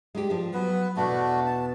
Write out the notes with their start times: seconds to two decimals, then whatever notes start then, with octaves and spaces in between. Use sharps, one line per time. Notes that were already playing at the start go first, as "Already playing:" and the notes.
0.15 G#3 D4 G4
0.30 F3 D4
0.54 F#3 B3 B4
0.97 E2 B2 A3 B3 D4 F#4
1.47 A5